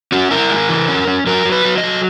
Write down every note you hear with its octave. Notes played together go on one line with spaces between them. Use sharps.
C#4 F#4
E4 A#4
G#3
E3
C#4
C#4
F#3 A#4
F#3
B4
F#3
D#5
F#3